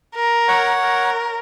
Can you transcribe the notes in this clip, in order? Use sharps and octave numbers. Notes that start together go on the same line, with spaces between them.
A#4
C#5 F#5
A#4